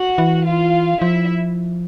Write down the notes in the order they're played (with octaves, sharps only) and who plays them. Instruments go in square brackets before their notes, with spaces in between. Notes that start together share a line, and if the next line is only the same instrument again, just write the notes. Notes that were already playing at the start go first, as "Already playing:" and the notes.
Already playing: [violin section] F#4 F#5
[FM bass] E3
[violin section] F4 F5
[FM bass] F3 [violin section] E4 E5